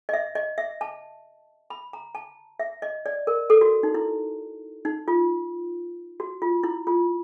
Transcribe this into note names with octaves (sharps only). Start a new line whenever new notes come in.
D#5
E5
D#5
E5
A5
B5
A#5
A5
E5
D#5
D5
A#4
A4
F#4
D#4
E4
D#4
F4
F#4
F4
E4
F4